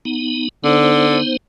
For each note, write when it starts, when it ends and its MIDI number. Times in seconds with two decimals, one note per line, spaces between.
0.05 0.49 59
0.05 0.49 63
0.64 1.18 50
0.64 1.37 59
0.64 1.37 63
0.64 1.37 72